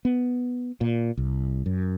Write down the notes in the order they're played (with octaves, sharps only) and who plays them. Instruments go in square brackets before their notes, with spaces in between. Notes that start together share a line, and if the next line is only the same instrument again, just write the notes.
[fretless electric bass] B3
A#2
C2
F#2